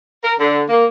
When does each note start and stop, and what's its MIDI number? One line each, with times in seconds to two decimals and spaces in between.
0.24 0.34 70
0.39 0.63 50
0.69 0.85 58